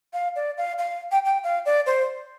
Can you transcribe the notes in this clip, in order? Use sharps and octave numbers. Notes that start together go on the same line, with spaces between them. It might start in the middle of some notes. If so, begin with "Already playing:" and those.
F5
D5
F5
F5
G5
G5
F5
D5
C5